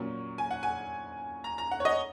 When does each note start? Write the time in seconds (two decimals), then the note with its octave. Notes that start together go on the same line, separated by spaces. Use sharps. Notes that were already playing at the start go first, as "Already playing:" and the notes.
Already playing: A#2 F#3 A#3 C#4
0.38 G#5
0.51 F#5
0.63 G#5
1.44 A#5
1.58 A#5
1.71 F#5
1.80 C#5
1.85 D#5